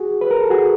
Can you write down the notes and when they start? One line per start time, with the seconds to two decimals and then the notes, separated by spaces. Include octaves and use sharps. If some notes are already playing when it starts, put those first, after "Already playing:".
Already playing: F#4 G#4
0.21 B4
0.31 A#4
0.41 A4
0.50 F#4 G#4